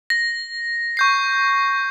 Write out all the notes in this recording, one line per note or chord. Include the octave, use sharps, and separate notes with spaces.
A#6
C#6 G6 C7